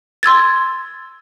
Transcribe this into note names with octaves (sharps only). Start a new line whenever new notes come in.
C6 E6 G#6 A6